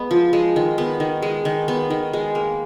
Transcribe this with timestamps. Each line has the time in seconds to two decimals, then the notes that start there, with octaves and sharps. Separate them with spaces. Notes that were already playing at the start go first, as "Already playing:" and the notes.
Already playing: G#3 B3
0.11 F3
0.33 G#3
0.56 D#3
0.78 B3
1.00 D#3
1.22 G#3
1.45 D#3
1.68 B3
1.90 D#3
2.13 G#3
2.35 A#3